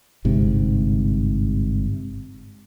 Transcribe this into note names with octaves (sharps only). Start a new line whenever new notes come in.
G1 G#2 C3